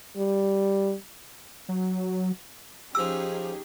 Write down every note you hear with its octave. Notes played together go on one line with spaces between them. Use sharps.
G3
F#3
F3 C#4 D#4 G4 G#4 D6 E6